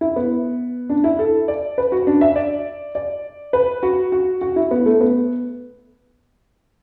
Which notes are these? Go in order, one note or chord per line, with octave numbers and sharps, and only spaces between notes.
E4
B3
D4
E4
A4
D5
B4
F#4
D4
E5
D5
D5
B4
F#4
F#4
F#4
E4
B3
A3
B3